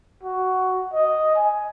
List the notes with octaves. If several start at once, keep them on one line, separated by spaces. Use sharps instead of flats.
F#4
D#5
G#5